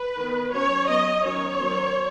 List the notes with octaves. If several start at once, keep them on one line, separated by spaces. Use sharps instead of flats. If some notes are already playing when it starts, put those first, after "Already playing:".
Already playing: B4
D#3 B3
F#3 C#4 C#5
F#3 B3 D#5
D#3 F#3 C#4 C#5
D#3 F#3 B3